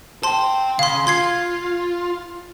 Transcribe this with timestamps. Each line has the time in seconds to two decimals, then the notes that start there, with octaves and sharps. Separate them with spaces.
0.23 C5 G5 A5 C6
0.79 C#3 F5 C6
1.07 F4 C6 G#6 C7